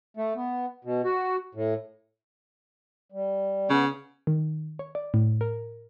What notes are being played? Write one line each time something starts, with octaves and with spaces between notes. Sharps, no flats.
A3
B3
B2
F#4
A2
G3
C#3 B3
D#3
C#5
D5
A2
A#4